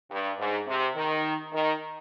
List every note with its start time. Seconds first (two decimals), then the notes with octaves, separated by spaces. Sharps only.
0.10 G2
0.38 G#2
0.67 C3
0.95 D#3
1.52 D#3